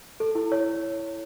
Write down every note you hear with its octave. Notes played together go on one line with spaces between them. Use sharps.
A4
E4
C#5